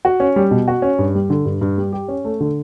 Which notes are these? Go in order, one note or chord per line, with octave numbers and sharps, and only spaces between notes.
F#4
C#4
G3
B2
F#4
C#4
G2
G3
D3
G2
G2
G3
G4
C#4
A3
D3